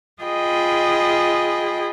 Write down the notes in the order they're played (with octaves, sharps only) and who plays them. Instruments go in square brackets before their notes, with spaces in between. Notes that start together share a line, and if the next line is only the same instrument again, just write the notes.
[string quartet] F4 G#4 D#5 G5 B5